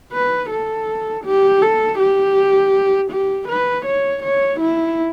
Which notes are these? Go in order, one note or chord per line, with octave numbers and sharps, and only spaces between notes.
B4
A4
G4
A4
G4
G4
B4
C#5
C#5
E4